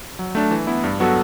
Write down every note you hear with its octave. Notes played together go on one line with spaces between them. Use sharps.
F#3
A3 D4
E3
B3 E4
G2
F#3 B3 F#4 A4